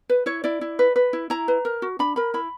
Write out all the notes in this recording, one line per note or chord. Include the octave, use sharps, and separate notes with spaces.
B4
E4 C#5
E4 D5
E4
B4
B4
E4
E4 A#5
B4
A#4
F#4
D4 B5
A#4 B5
E4 B5